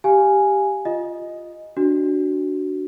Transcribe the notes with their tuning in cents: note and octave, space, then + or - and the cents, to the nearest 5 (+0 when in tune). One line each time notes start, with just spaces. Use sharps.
G4 +0 F5 +0 G#5 +0
F4 +0 D#5 +0
D4 +0 F#4 +5